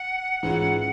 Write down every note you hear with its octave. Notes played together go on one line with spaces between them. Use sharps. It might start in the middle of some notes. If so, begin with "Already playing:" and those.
Already playing: F#5
G#2 E3 G#3 C#4 F4